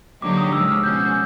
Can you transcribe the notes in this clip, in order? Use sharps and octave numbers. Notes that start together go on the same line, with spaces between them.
D3 F#3 A#3 D#4 G4 D6
D#6
C#3 F3 G#3 E6
F6
B2 G#3 C#4 F#4 G6